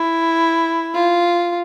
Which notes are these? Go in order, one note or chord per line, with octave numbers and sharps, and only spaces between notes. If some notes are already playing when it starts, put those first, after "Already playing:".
Already playing: E4
F4